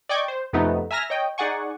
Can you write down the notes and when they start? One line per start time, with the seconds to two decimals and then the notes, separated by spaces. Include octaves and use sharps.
0.09 D5 D#5 G5 C#6 D6 G#6
0.28 C5
0.53 F2 C3 A3 B3 D#4
0.91 E5 G#5 A#5 F6 A#6
1.10 C#5 D#5 G5
1.38 D#4 G#4 D5 F#5 G#5 C#6